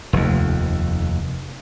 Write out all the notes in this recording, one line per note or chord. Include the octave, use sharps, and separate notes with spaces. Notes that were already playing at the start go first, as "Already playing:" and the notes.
F1 D#2